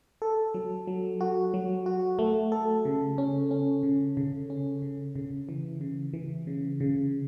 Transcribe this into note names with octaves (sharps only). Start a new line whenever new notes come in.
A4
F#3
F#3
F#4
F#3
F#4
A3
A4
C#3
C#4
C#4
C#3
C#3
C#4
C#3
C#3
E3
C#3
E3
C#3
C#3